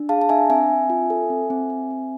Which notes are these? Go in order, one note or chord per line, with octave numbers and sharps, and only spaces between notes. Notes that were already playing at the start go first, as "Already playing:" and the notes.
Already playing: D4
G#4 F5 A5
A5
D4 E5 G#5
C4 E5 G#5
C4
F4
A4
C4
C4
C4
C4